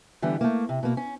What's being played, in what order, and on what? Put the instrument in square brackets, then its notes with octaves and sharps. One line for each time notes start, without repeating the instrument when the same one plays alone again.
[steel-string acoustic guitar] D3 E3 G3 B3
A3 A#3
C3
B2 A#3
C#4